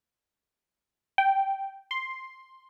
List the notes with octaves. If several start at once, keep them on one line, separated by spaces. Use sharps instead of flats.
G5
C6